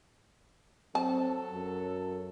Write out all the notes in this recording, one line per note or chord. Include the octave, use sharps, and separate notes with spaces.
F#3 C4 A4 A5
F#2